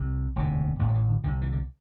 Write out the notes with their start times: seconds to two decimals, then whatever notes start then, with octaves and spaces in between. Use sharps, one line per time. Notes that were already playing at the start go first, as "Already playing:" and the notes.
Already playing: C2 C3
0.36 E1 D2 C3
0.79 A1 A2 A3
0.89 F3
0.94 E3
1.08 D3
1.23 C2 D3
1.26 C3
1.41 E3
1.52 D3